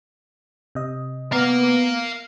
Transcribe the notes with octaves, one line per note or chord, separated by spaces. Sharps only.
C3 D#5
B3 F5 A#5